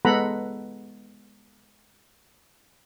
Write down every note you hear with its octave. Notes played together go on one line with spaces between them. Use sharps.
G#3 B3 A4 F#5 A#5 B5